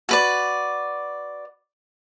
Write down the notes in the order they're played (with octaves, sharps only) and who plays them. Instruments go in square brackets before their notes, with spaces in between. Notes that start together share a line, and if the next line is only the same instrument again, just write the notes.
[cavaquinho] F#4 B4 D5